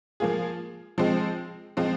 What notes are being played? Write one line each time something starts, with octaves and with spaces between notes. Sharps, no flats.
F3 A#3 F4 G#4
F3 G#3 C4
F3 G#3 C4 F4